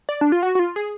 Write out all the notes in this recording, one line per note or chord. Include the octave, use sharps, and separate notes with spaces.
D5
D4
F4
F#4
F#4
F4
G#4